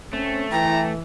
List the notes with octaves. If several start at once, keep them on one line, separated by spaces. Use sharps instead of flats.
A3 C4 C#4
E3 G5 A#5